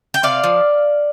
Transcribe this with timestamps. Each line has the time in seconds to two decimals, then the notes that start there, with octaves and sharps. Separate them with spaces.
0.14 G5
0.23 C3 D5 F5
0.44 F3